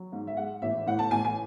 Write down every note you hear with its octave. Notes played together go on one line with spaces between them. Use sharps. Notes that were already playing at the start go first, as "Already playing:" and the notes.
Already playing: F#3
G#2
E5
G#3 F#5
A1 E5
A2 F#5
A5
A1 G#5
G#5